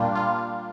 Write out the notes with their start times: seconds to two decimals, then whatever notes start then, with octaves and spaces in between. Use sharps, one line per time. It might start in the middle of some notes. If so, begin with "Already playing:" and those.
Already playing: A#2 G3 A#3 D4 F4
0.15 F4